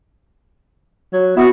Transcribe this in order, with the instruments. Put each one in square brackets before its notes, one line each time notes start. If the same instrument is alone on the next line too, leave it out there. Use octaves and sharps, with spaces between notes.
[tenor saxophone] F#3
[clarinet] B3 [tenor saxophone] E4 [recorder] F#4